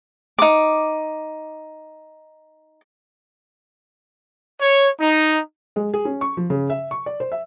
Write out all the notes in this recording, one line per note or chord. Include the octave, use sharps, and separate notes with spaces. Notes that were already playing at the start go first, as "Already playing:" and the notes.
D#4 D6
C#5
D#4
G#3
G#4
C#4
C#6
F3
C#3
E5
C#6
D5
C5
E5